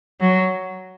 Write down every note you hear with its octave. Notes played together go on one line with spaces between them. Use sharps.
F#3